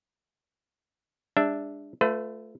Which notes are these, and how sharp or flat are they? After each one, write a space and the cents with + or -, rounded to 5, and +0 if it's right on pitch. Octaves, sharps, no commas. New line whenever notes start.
G#3 -45 D4 +0 E5 +0
A3 +0 F4 +0 B4 +35